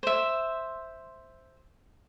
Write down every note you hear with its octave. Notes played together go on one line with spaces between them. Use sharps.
C5 E5